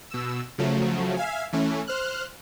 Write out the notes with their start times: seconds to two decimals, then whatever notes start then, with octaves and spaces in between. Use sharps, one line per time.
0.10 B2 E6
0.58 C#3 F3 F#3 A3
1.17 E5 F5 G#5
1.53 E3 A3 C#4
1.87 C5 F6 F#6